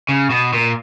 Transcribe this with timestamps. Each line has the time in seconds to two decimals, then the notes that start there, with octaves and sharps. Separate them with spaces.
0.09 C#3
0.30 B2
0.53 A#2